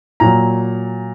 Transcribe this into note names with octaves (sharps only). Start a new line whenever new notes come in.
A#2 F#3 A#5